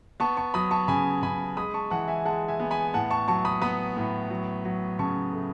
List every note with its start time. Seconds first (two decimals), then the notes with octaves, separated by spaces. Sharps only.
0.20 B3 A5 C#6
0.37 A5 C#6
0.54 F#3 B5 D#6
0.71 A5 C#6
0.88 C#3 G#5 B5
1.22 C#3 G#5 B5
1.57 G#3 B5 D#6
1.74 A5 C#6
1.91 E3 F#5 A5
2.08 E5 G#5
2.25 G#3 F#5 A5
2.48 E5 G#5
2.60 B3
2.71 G#5 B5
2.94 A2 F#5 A5
3.11 A5 C#6
3.28 F#3 A5 C#6
3.45 B5 D#6
3.62 B3 B5 D#6
3.97 A2
4.30 F#3
4.65 F#3
4.99 C#3 A5 C#6
5.33 A3